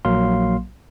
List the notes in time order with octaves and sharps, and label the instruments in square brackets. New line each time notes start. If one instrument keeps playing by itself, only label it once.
[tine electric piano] A#1 F#3 A#3 F5 C6